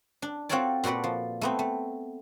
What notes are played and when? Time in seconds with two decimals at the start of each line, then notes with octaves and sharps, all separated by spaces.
0.22 D4
0.49 C4 F4 F#4 A4 C#5 D5
0.84 A#2 F#4 A4 B4 D5
1.04 F3
1.41 A3 B3 C4
1.59 A3